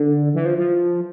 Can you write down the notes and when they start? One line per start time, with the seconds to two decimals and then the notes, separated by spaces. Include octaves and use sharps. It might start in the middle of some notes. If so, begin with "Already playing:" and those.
Already playing: D3
0.35 E3
0.45 F3
0.58 F3